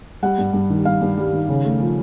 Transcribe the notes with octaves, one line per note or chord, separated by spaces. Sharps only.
G3 F#5
G2
G2
D#3
G2 F5
G2
G3
D#3
C#3
A3
F3